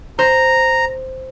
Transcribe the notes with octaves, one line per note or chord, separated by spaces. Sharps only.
C5 A#5